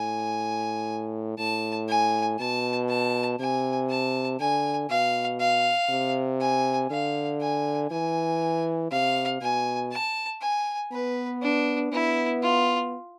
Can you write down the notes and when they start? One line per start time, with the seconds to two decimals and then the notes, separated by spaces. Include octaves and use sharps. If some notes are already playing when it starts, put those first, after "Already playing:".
Already playing: A2 G#5
1.39 A2 A5
1.89 G#5
2.39 B2 A5
2.89 A5
3.39 C3 G#5
3.90 A5
4.40 D3 G#5
4.90 B2 F5
5.40 F5
5.90 C3
6.40 G#5
6.91 D3 F5
7.41 G#5
7.91 E3 G#5
8.91 C3 F5
9.41 B2 G#5
9.92 A5
10.42 G#5
10.92 B3 B4
11.42 D4
11.92 B3 E4
12.42 F4